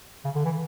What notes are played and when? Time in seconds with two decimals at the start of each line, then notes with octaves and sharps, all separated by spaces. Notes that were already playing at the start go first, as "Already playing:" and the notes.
0.25 C#3
0.35 D3
0.45 E3